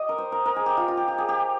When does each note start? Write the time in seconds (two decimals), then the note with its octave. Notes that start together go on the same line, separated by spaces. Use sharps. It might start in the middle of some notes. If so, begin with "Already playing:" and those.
Already playing: G4 D#5
0.09 A#4
0.18 C5
0.32 A#4
0.46 A#4
0.56 G#4
0.66 G4
0.77 F4
0.88 F4
0.97 G4
1.08 G4
1.18 G#4
1.29 G4